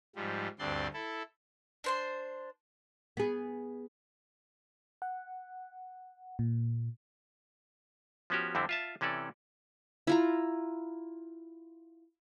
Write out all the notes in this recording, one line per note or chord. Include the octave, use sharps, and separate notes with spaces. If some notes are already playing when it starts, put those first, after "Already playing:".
G#2 F3 G3
D2 G2 C4 D5 C6
E4 A4
D4 C5 C6
B3 G#4
F#5
A#2
F3 B3 C#4 F#4 G4
F2 D3 G3 C4 E4
F4 E5 A5
C3 E3 C#4 A4 D5
E4 F4 A#5